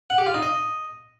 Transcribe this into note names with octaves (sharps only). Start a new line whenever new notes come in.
F#5
G4
F4
D#4
D#5